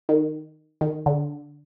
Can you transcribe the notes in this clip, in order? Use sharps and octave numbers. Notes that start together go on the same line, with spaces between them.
D#3
D#3
D3